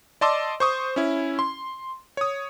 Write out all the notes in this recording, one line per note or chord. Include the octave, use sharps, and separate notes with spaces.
D5 D#5 A5 C6 D6 E6
C5 C#6 D#6
C#4 E4
C6
C#5 D#6